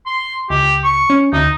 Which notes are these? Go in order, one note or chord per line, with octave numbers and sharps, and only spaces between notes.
C6
C#2 G4
C#6
C#4
D2 D#4